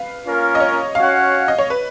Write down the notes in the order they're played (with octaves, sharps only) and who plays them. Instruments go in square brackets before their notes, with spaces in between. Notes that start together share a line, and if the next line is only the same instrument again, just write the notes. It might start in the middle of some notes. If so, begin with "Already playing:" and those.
Already playing: [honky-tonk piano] B4 F5
[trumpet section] A#3 C#4 F4 A#4
[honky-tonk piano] D#5
C#5
[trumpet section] C#4 F#4 C#5 F#5 [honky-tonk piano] F5
[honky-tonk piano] D#5
C#5
B4